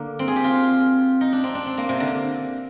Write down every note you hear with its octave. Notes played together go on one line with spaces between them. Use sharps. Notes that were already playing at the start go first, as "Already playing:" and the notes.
Already playing: D3 A#3
C4
G#4
G4
F4
D#4
D4
C4
D4
C4
A#3
C3
D3